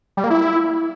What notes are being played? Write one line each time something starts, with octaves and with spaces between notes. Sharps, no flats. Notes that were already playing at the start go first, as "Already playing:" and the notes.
G3
A#3
E4